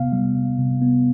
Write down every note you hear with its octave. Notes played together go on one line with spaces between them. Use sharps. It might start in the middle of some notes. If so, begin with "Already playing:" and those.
Already playing: C3 B3 F5
G3
C3
C3
B3